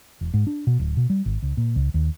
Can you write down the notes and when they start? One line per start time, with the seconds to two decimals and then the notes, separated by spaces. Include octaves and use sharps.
0.21 E1
0.34 G#2
0.47 D4
0.67 B2
0.79 D1
0.97 B2
1.10 G3
1.26 G#1
1.42 C#2
1.57 A#2
1.76 C#2
1.94 D#2